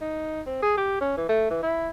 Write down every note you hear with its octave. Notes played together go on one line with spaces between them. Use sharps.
D#4
C4
G#4
G4
C#4
E3
A3
E3
E4